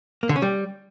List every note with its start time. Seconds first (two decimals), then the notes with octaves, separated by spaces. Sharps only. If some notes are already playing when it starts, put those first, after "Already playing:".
0.23 A#3
0.29 D3
0.36 C#4
0.42 G3